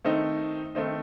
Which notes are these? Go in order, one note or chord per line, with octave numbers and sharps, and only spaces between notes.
D#3 A3 C4 D#4
D#3 A3 C4 D#4